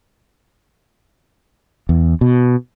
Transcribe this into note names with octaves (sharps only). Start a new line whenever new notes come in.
E2
B2